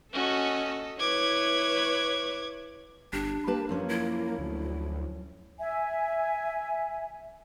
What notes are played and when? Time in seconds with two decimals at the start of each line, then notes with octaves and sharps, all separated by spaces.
0.13 C#4 F#4 A4 D#5
0.99 E4 B4 C#5 D6 G#6
3.13 G1 D4 G4
3.47 A#3 G4 B4 A5
3.69 F#2 F3 C#4
3.89 E4
4.39 D2
5.59 E5 G#5